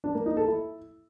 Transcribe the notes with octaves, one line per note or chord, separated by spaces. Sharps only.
D4
A#3
D#4
A4
E4